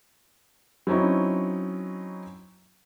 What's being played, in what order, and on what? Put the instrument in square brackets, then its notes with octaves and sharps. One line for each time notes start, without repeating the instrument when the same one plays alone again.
[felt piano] F#3 C4 C#4 D#4 E4